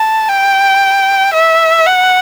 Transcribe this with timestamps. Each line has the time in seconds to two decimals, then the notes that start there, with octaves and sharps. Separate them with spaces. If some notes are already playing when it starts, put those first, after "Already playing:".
Already playing: A5
0.28 G5
1.34 E5
1.86 F#5